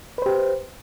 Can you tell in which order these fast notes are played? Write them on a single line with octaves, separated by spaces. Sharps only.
B4 C5 G4